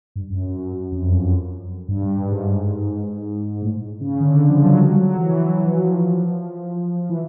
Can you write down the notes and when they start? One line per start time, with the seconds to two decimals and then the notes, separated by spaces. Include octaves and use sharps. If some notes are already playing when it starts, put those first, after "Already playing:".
0.16 G2
0.30 F#2
0.43 F#2
0.58 F#2
0.73 F#2
0.92 F2
1.12 F#2
1.88 G2
2.03 G2
2.18 G#2
2.32 G#2
3.62 A2
4.00 C#3
4.20 D3
4.49 F3
4.63 F#3
4.78 G3
4.97 F#3
5.16 E3
5.36 E3
5.64 F3
7.09 E3